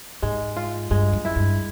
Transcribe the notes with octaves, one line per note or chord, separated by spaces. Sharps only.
G#2 G#3
F4
G2 G#3
F#2
E4
G2